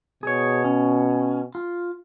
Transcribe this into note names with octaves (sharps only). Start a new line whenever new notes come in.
B2 G#4 C#5
C#4
F4